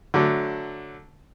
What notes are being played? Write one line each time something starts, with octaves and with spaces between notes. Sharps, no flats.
D3 F#3 A3